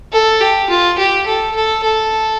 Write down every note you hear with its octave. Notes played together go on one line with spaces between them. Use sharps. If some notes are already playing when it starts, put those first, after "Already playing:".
A4
G4
F4
G4
A4
A4
A4